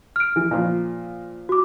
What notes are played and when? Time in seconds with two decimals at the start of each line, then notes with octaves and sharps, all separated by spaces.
0.16 F6 D7
0.36 E3
0.51 A#2 F3
1.49 F#4 D6